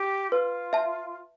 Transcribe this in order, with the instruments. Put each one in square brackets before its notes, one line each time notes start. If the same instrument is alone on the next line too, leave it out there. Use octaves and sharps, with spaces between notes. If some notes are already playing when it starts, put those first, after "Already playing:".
Already playing: [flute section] G4
[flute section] F4 [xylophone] B4
[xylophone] E5 A5